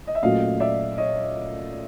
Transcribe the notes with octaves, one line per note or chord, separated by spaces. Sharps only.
D#5
E5
A#2 F#3 A3 C#4 D#5 F5
D5 E5
C#5 D#5